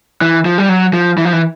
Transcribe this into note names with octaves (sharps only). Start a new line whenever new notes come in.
E3
F3
G3
F#3
F3
E3
F3
E3